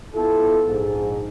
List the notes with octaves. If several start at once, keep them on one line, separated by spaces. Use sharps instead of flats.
B3 E4 F4 A4
A#1 G#2